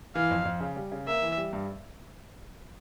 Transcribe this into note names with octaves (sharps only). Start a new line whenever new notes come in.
E3 F5
F2
F2
C#3
G3
C#3
A#3 E5
E3
G3
G2